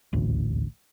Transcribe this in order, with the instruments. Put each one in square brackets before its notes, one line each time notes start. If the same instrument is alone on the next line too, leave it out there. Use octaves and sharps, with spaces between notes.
[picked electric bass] D#1 A1 D2